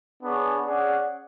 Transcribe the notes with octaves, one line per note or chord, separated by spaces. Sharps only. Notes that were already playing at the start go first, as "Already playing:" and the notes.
B3 D4 G#4 C#5
C#4 G#4 D5 F#5